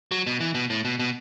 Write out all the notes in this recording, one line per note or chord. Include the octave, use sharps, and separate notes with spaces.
F#3
B2
E3
B2
A2
B2
B2